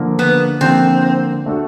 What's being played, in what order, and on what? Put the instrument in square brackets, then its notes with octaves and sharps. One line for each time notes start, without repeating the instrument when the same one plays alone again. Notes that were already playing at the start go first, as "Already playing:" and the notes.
Already playing: [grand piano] D3 F3 A#3
[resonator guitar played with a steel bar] B3
[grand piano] D3 F3 A#3 [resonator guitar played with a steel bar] C4
[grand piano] A3 D4 F#4 A4